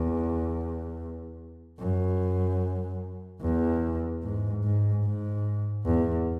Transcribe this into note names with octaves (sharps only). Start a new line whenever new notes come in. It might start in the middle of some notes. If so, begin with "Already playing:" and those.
Already playing: E2
F#2
E2
G#2
G#2
G#2
E2